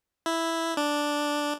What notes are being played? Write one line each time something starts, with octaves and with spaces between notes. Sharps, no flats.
E4
D4